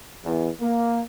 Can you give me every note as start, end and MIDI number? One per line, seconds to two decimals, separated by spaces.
0.24 0.48 40
0.61 1.01 58